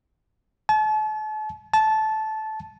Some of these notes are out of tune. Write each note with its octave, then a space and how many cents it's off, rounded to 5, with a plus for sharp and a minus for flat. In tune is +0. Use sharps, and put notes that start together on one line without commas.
A5 -40
A5 -15